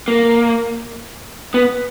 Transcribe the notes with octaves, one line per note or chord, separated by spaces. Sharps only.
A#3
B3